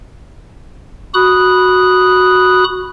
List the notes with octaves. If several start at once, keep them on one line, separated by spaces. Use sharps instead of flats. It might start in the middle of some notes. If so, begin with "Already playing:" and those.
F#4 B5 D#6 F#6